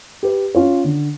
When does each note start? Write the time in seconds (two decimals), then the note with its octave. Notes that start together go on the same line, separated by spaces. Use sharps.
0.23 G4 B4
0.55 C#4 F4 C#5
0.84 D3